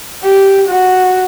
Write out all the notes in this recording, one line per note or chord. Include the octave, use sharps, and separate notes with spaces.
G4
F#4